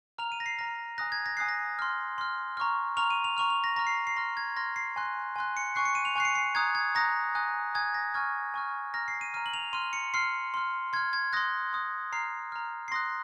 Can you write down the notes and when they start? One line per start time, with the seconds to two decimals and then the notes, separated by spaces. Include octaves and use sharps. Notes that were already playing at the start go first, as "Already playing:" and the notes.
0.18 A#5 F6 F7
0.32 D#7
0.40 A#6
0.46 C7
0.58 A#5 F6 A#6
0.98 G#5 D#6 F#6 A#6
1.12 G#6
1.26 A#6
1.37 G#5 D#6 F#6 C7
1.49 A#6
1.79 C6 F6
2.18 C6 F6
2.57 A#5 C#6 F6
2.97 A#5 C#6 F6 F7
3.10 D#7
3.24 F7
3.37 A#5 C#6 F6 F7
3.50 F7
3.64 A#6
3.76 A#5 C#6 F6 A#6
3.87 C7
4.07 C7
4.17 C6 F6 A#6
4.37 G#6
4.56 C6 F6 A#6
4.76 C7
4.96 G#5 C6 F#6
5.36 G#5 C6 F#6
5.57 C#7
5.75 G#5 C#6 F#6 C7
5.85 C#7
5.95 D#7
6.05 F7
6.16 G#5 C#6 F#6 C7
6.25 C#7
6.35 C7
6.55 A#5 D#6 F#6 G#6
6.75 G#6
6.95 A#5 D#6 F#6 A#6
7.35 G#5 D#6 F#6
7.75 G#5 D#6 F#6 G#6
7.94 A#6
8.14 G#5 C#6 F6 G#6
8.54 G#5 C#6 F6
8.94 A#5 F6 A#6
9.08 C7
9.21 D#7
9.34 A#5 F6 D#7
9.46 F#7
9.54 F7
9.73 C6 F6 D#7
9.93 C#7
10.14 C6 F6 C7
10.54 C6 F6
10.93 C6 G#6
10.96 F6
11.13 G#6
11.33 C6 D#6 F#6 A#6
11.73 C6 D#6 F#6
12.12 A#5 F6 C7
12.52 A#5 F6
12.88 C7
12.91 C6 D#6 F#6 A#6